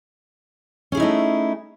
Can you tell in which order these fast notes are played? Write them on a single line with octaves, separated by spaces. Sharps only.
C#4 G#4 E4 D#4 A3